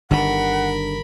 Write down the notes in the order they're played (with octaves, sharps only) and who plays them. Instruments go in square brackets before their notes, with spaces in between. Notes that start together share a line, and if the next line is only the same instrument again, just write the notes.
[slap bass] G1 D#3 [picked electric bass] D3 [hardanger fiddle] A#4 B5 [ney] F#5